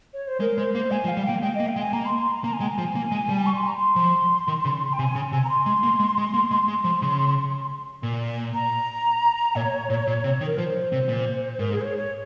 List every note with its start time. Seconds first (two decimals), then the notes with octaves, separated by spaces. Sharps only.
0.14 C#5
0.27 C5
0.40 G#3 A#4
0.58 G#3 C5
0.74 A#3 C5
0.91 G#3 G#5
1.04 F3
1.09 F5
1.17 G3
1.25 A#3 G5
1.42 G#3 G5
1.55 A#3 D#5
1.68 G5
1.76 G#3
1.80 G#5
1.93 A#3 A#5
2.06 C6
2.18 C6
2.31 A#5
2.44 A#3 A#5
2.53 G#5
2.60 G#3 G5
2.71 G#5
2.78 F3
2.95 A#3
3.12 G#3
3.29 G3
3.46 C#6
3.56 C6
3.67 A#5
3.77 C6
3.96 F3
4.48 D#3
4.65 C#3
4.93 G5
4.98 C3 G#5
5.15 C#3
5.32 C3 G#5
5.44 A#5
5.49 C6
5.66 G#3
5.83 A#3
5.99 G#3
6.18 G#3
6.34 A#3
6.51 G#3 C6
6.68 G#3
6.84 F3
7.02 C#3
8.03 A#2
8.54 A#5
9.56 A#2 C#5
9.90 A#2
10.07 A#2
10.24 C3
10.41 D#3
10.46 A#4
10.57 F3 C5
10.92 C3
11.09 A#2
11.59 G#2 A#4
11.72 G#4
11.81 C5
11.85 C#5
11.97 C#5